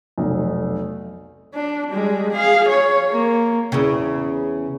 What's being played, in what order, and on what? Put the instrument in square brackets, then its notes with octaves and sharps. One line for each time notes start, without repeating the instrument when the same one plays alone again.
[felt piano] F1 B1
[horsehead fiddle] D4
G3 G#3
G#4 F5
C#5
A#3
[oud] E2 C#3